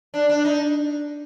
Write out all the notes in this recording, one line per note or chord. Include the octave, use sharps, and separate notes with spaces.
D4
D4
D#4